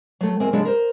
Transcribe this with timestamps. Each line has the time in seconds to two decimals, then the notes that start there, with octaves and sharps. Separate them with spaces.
0.21 F#3 A3
0.40 E2 G#3 C4 A#4 G#5
0.53 C#3 F#3 G#3 C#4 D4 A4
0.65 A#4 C5